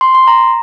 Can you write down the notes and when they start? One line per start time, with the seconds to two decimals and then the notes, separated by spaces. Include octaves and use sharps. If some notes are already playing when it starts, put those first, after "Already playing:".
0.01 C6
0.15 C6
0.27 A#5